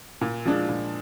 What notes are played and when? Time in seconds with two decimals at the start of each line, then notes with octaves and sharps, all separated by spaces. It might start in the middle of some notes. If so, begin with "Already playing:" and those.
0.21 A#2
0.45 F3 G#3 D4
0.69 A#2